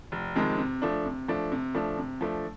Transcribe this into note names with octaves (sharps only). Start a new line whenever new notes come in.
F1
F2 C3 D#3 G#3
C3
F3 A3 D4
C3
F3 A3 D4
C3
F3 A3 D4
C3
F3 A3 D4